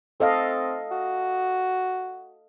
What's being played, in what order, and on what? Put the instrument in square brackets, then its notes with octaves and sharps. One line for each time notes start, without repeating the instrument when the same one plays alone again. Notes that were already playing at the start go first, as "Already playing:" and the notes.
[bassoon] C4 [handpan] A4 D#5 F5
[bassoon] F#4